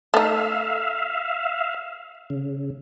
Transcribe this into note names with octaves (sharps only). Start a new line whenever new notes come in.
A3 D#4 E5 F5
C#3